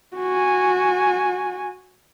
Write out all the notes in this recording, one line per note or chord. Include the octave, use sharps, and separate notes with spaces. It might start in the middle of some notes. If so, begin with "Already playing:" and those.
F#4 G#5